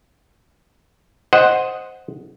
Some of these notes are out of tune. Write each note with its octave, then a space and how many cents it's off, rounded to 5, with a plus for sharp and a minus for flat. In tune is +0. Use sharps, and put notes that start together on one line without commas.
C5 +0 D#5 +0 F#5 -5